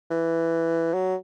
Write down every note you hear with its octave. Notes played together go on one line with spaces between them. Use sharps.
E3
F#3